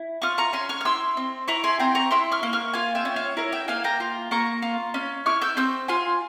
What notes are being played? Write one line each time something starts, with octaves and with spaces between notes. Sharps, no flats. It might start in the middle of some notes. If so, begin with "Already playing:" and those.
Already playing: E4
F4 C#6 F6
A#5 C#6
C#4 G#5 C6
C#6 F6
F6
E4 C6 E6
C4
E4 A#5 C#6
G#5 C6
C4 G5 A#5
A#5 C#6
E4 C6 E6
C#6 F6
A#3
C#6 F6
F4 F5 G#5
E5 G5
C#4
C#5 F5
E4 A#4 C#5
E5 G5
A#3 F5 G#5
G5 A#5
F4
A#3 A#5 C#6
F4
C#4
E4 C#6 F6
E6 G6
C4 E6 G6
F4 G#5 C6